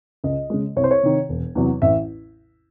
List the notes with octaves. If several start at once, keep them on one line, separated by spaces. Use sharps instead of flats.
C#2 D#5
C#3 G#3
C2 C#5
C5
C#5
C3 D#3
E1
E2 C3 F#3
A1 E5